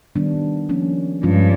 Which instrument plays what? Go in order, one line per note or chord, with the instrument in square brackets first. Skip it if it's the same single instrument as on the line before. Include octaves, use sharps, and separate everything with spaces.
[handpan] D#3 G3 B3 D4
F3 A#3 C#4
[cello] G2 [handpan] F3 G#3 C#4 F4